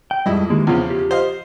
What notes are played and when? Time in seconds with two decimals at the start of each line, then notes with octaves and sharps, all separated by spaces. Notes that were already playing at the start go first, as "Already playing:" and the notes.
0.11 G5
0.26 F2 G3 G#3 E4 D#5
0.50 D#3 E3 G#3 A#3
0.67 E2 C#3 F3 B3 C4
0.90 G4
1.11 C5 D#5 F5